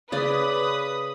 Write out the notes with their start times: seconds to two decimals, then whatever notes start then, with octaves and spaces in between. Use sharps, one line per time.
0.12 C#3 B4 D5 D#6